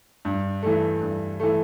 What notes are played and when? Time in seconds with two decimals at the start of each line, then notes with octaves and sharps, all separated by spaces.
0.25 G2
0.63 E3 A3
1.01 G2
1.40 E3 A3